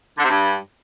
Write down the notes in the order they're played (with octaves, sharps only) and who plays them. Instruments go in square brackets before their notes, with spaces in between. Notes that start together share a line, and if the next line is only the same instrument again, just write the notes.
[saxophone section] D3
C3
G2